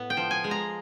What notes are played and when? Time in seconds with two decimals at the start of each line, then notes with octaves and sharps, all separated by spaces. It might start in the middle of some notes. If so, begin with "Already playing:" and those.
Already playing: A2 B3
0.10 G5
0.17 F3
0.31 G#5
0.44 G#3
0.51 A#5